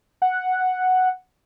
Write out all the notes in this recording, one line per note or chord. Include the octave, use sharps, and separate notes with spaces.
F#5